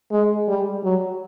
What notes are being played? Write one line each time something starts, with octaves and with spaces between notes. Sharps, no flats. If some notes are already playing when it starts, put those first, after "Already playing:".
G#3
G3
F#3